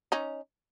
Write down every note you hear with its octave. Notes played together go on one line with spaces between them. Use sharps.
C#4 D#4